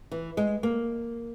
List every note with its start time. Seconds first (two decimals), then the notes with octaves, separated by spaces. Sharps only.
0.11 E3
0.37 G#3
0.63 A#3